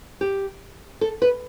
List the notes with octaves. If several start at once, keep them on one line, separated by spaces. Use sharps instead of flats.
G4
A4
B4